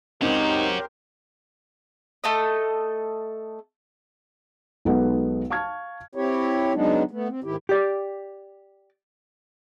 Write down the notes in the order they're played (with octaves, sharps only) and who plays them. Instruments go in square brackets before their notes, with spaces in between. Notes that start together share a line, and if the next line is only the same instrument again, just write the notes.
[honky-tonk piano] C#2 C4 [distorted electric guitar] C#4 F#4 [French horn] D#4 [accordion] G4 A#4 C5
[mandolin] A3 A4 D#5
[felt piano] B1 G#3 B3 D#4 A4 F#5
F5 A5 C#6 F6 G#6
[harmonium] C4 E4 G4 C#5
C#3 F#3 G#3 B3 D4 D#4
A3 B3
C4
G#2 D#3 E4 G4
[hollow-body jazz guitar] G4 D5